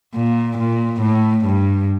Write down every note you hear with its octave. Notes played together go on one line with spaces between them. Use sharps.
A#2
A#2
A2
G2